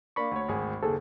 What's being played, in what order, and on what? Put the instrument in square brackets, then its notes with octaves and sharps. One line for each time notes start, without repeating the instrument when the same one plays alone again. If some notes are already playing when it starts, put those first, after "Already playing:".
[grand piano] A#3 D4 [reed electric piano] B5 C#6
[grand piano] D2 C#5
G#1 D2 G#4
[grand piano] F#1 D#2 [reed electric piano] G#4 A4